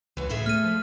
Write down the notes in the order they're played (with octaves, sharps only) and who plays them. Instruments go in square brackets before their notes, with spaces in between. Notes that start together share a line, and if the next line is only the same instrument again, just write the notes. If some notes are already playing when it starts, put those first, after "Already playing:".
[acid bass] C#2 [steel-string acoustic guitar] E3 F#4
[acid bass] A2 [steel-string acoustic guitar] G#4 A4 E5
[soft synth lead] A3 [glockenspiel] F6 D#7
[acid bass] F3